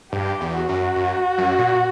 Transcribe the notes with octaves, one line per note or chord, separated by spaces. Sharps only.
G2 G4
E2
F#4
F#2
F#2
F#2
A#2